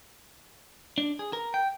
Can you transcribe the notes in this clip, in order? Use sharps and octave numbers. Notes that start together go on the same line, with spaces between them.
D4
G#4
A#4
G5